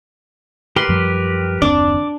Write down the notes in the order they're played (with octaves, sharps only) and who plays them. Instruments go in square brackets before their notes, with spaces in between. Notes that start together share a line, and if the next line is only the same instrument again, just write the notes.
[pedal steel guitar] G4 A#4 B4 [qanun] C6
[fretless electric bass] F#2 F3 G3
[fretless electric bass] F#1 D#2 C4 [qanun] D4 [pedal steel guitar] D5 D6